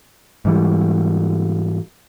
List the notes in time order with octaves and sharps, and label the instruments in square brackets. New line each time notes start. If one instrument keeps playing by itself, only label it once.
[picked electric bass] G#2 E3 G3